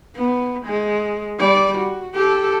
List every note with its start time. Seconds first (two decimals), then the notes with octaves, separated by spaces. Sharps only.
0.16 B3
0.66 G#3
1.39 G3 D5
1.79 F#4
2.14 G4 A4